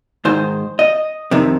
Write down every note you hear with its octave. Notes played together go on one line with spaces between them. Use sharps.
G#2 D#3 C5
D#5
F2 C3 D#3